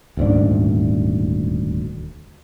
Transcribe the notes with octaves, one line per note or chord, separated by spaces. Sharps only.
D#1 D2 G#2 D4